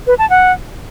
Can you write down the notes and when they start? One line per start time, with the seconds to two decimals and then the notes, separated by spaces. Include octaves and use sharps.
0.07 B4
0.18 A5
0.30 F#5